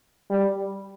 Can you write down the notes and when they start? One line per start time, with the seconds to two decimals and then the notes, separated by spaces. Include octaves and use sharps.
0.30 G3